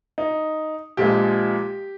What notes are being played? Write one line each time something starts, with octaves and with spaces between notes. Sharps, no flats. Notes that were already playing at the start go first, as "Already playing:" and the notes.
D#4
A#1 A#2 F3 G#3 G4